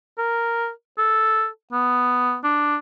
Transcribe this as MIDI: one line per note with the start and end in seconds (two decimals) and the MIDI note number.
0.18 0.70 70
0.98 1.47 69
1.73 2.36 59
2.44 2.76 62